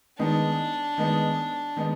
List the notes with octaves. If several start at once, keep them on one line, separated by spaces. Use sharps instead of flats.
D#3 G#3 B3 D4 D#4
D#3 G#3 B3 D#4
D#3 G#3 B3 D#4